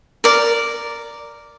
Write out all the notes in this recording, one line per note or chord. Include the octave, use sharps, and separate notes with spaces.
A#4 D5